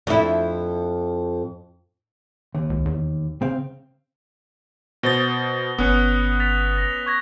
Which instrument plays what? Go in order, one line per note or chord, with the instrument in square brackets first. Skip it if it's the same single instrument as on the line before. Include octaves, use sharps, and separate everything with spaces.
[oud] F2 E4
[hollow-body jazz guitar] D#2
[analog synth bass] C#2
E2
[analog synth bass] C#3 [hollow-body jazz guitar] C4 F5
[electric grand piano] B2 C5 A6 [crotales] D#6 A#6 G7
[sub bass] G1 [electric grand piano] B3 C#4 [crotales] D#6 F#6 C#7
[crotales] A6 B6 F7
A#6 F7
C#6 G#6 A#6